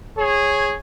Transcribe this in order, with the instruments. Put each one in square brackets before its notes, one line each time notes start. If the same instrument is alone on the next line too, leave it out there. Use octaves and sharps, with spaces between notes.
[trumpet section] G#4 C#5